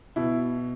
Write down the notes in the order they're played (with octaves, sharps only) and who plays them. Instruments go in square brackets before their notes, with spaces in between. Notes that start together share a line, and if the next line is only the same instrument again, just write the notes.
[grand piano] B2 E4